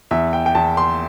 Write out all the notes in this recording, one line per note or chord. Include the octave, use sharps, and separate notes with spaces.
E2 E5
G5
G5
E2 A5
C6